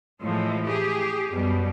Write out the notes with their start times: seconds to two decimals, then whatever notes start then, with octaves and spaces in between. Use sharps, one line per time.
0.22 A2 E3 F3 G#3
0.66 G4 G#4
1.30 F#2 B2 G3